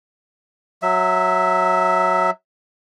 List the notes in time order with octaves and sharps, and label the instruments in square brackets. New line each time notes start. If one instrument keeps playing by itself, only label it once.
[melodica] F#3 E5